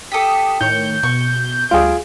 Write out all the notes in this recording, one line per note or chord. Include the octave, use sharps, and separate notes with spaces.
G4 A4 D6 D#6 B6
A2 D#3 C#5 G6
B2 C#6
D2 G3 F4 G#4 D7